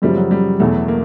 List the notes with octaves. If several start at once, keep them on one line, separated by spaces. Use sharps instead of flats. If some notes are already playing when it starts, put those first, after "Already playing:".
F#2 C#3 F3 G3
F#3
G3
E2 B2 F#3 A3
A#3